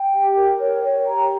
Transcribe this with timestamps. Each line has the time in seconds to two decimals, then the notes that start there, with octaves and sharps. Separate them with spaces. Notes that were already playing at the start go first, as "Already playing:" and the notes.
Already playing: G5
0.13 G4
0.36 A#4
0.60 C#5
0.82 C#5
1.06 G4 A#5